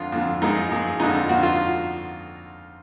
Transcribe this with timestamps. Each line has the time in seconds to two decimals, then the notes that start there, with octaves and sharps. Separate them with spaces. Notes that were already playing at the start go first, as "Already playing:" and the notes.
Already playing: F2 D3 F3 F4
0.12 F2 D3 F3
0.42 F#2 F3 G#3 D#4
0.71 F#2 F3 G#3
1.00 F2 D3 F3 D#4
1.29 F2 D3 F3 F#4
1.43 F4